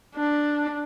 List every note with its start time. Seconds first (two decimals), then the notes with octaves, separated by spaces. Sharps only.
0.15 D4